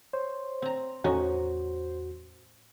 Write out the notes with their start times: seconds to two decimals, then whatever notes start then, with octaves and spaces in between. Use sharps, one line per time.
0.13 C5 C#5
0.62 C4 A#5
1.04 E2 A2 C#4 D#4 F#4